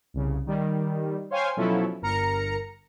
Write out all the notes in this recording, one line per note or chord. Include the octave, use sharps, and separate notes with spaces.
C2 C#3
D#3 G3
C5 C#5 F5 G5 G#5 C6
B2 F3 F#3 C#4 E4 A4
G1 A#4 A#5 C#7